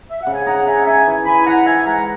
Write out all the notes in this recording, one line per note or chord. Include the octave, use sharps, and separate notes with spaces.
E5
C#3 F#5
G#5
D#4 F#5 A#5
D#4 E5 G#5
F#5
D#4 E5 G#5
E3
E3 G#5 B5
E3 F#5 A#5
D#4 E5 G#5
G#3 F#5 A#5